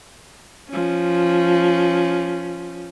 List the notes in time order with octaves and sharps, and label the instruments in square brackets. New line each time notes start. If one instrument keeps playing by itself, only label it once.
[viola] F3 C#4